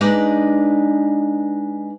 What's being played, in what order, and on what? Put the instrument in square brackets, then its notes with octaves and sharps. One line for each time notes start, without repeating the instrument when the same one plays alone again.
[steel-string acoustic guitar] G#3 D4 D#4 B4 D5